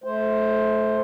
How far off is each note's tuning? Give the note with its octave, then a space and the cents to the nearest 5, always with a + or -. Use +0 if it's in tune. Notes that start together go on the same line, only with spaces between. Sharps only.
A3 -20 C5 +5